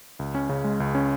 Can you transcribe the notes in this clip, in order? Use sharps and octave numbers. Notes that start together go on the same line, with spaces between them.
C#2
C#4
C#3
G#3
C#2
C#4